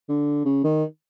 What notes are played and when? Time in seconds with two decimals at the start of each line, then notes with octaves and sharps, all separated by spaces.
0.09 D3
0.45 C#3
0.64 D#3